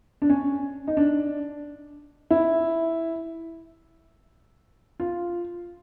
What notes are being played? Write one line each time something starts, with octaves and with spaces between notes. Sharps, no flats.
D4
C#4
D#4
D4
E4
F4